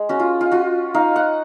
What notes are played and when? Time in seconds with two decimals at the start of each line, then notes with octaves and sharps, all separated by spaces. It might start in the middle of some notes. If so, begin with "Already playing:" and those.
Already playing: G#3
0.09 C#4 F#4
0.20 F4
0.41 F4
0.52 F4 F#4
0.94 D#4 F5
1.16 F#5